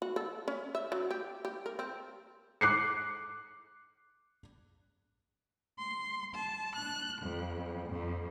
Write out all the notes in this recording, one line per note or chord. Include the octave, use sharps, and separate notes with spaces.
F#4
A4
C#4
E5
F#3
G4
G4
A#4
C4
D6 F#6 C7 C#7
C6
A5
F#6
F2
F2